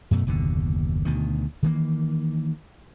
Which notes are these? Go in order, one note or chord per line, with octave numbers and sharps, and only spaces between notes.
F#2 B2 A3
F#1 D#2 B2 D3
D2 B2 D#3
D#3 E3 A#3